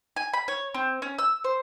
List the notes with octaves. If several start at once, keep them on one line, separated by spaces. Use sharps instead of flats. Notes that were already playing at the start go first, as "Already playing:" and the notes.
G#5
B5
C#5
C4
C#4
E6
C5